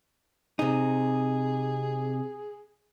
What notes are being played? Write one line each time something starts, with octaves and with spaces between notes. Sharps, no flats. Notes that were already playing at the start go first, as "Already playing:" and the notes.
C3 D#4 G#4